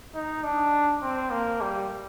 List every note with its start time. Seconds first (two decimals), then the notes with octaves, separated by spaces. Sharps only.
0.15 D#4
0.44 D4
1.02 C4
1.31 A#3
1.61 G3